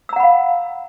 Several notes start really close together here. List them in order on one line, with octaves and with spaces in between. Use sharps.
E6 A#5 F#5 B5 F5